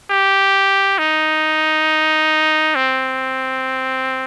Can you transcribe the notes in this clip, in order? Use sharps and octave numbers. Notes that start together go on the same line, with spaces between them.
G4
D#4
C4